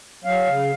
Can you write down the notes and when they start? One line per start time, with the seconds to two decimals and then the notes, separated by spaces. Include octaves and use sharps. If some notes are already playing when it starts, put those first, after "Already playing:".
0.24 F#3 F5
0.47 C#3